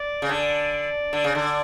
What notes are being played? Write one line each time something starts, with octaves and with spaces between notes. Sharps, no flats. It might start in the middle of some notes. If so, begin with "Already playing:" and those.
Already playing: D5
C#3
D3 D5
D3
C#3
D3